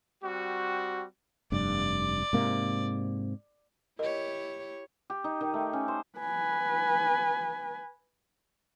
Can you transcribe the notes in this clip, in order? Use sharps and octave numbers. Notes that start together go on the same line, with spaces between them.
G3 C4 F#4
F1 G2 D5
G#2 C3 A#3
E4 G4 A#4 C#5 D#5
G4
D#4
D#3
A3
C#4
C5
B4 G#5